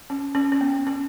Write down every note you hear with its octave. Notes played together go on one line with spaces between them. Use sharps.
C#4
C#4
C#4
B3
C#4